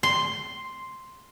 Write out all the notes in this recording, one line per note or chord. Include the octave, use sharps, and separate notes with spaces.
C6